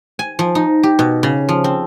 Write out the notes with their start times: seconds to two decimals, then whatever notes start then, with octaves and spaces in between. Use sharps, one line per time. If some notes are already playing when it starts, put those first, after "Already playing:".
0.19 G#5
0.39 F3
0.55 D#4
0.83 G4
0.99 B2
1.23 C#3
1.49 F3
1.64 C4